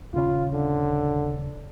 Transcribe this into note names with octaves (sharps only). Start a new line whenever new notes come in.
D#1 C#3 C#4 F4
D3